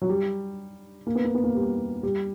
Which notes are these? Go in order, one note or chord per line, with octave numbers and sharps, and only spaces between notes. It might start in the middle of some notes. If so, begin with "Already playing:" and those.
F#3
G3
A#3
B3
A#3
B3
A#3
G3
G3